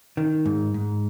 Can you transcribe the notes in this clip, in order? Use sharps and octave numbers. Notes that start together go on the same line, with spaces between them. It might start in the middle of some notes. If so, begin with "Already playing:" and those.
D#3
G#2
G#2